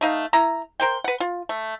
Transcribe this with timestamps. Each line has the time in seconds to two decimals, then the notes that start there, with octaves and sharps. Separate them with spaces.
0.01 A3 D#4 F5
0.33 E4 A#5
0.80 A#4 C5 G5
1.04 B4 F#5
1.20 F4
1.49 A3